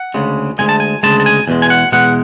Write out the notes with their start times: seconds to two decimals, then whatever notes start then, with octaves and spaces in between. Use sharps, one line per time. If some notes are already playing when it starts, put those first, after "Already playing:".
Already playing: F#5
0.14 D2 C#3 G#3
0.59 D2 C#3 G#3 G#5
0.69 A5
0.80 G#5
1.03 D2 C#3 G#3 A5
1.20 A5
1.26 G#5
1.48 E2 B2 G#3
1.62 G#5
1.70 F#5
1.92 E2 B2 G#3 F#5